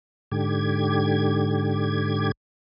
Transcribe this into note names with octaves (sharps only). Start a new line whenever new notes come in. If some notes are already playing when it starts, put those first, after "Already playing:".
G#2 D3 G4 G#6